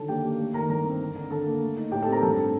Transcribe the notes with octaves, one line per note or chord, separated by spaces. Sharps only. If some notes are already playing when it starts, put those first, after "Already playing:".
Already playing: D3 D#3 F#3 A4 A5
A#3 G4 G5
A#3
A3
D#3 A#4 A#5
G2 A#4 A#5
C4
D3
D3
D3 A4 A5
A#3
A3
D#4
A2 G4 G5
A4 A5
C4
A#4 A#5
G2 A4 A5